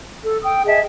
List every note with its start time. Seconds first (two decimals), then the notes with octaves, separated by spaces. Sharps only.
0.23 A4
0.42 G5 D#6
0.65 G#4 D#5 E5 A5